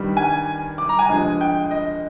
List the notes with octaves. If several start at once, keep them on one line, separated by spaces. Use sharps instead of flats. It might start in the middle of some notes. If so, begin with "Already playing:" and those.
Already playing: G2 D#3 G3
G#5
D6
A#5
G#5
G2 D3 F3 G#3
G5
D#5